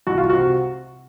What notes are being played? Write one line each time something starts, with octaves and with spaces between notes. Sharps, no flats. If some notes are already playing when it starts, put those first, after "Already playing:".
C2 F#4
F4
C3 F#4